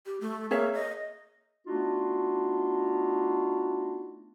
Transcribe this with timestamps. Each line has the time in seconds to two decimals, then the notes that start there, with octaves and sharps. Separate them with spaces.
0.06 G4
0.21 A3
0.51 A#3 G#4 C#5 E5
0.74 D#5
1.67 A3 B3 D4 D#4 F4 F#4